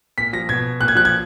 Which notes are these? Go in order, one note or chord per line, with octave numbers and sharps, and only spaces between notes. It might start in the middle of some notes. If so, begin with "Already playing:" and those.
A#2 B6
F3 A#6
B2 G#6
A#2 F#6
G#6
F3 F#6
G#6